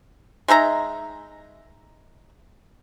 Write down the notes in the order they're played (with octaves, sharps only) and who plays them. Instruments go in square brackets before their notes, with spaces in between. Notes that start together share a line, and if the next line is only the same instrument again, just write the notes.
[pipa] G#3 D#4 E5 A#5